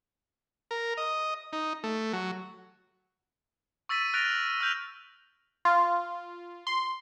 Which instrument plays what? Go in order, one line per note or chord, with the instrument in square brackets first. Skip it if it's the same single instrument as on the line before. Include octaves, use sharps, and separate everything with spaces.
[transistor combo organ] A#4
D#5
D#4
A3
F#3
[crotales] C#6 E6 A6 B6 D#7
F6 F#6 A6 A#6 D7 F7
E6 F6 G6 F7
[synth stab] F4
C6